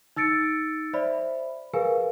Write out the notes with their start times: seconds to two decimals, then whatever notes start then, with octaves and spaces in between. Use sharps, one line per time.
0.16 D#4 E6 A6 C#7 D7
0.93 C5 D5 E5 B5
1.74 G#4 A#4 B4 F5 G#5